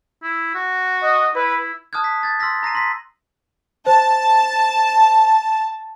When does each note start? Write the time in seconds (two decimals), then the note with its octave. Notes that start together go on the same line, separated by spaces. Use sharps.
0.23 E4
0.55 F#4
1.03 D#5
1.35 E4 B4
1.93 A5 D#6 F6 F#6 G#6
2.04 B6
2.23 G#6 A6
2.40 C6 E6 F6 A#6 B6
2.63 A#5 A#6 C7 D#7
2.75 C6 A#6 B6
3.87 C5 A5